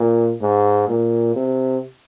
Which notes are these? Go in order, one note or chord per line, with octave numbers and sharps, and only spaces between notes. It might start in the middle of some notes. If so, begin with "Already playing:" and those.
Already playing: A#2
G#2
A#2
C3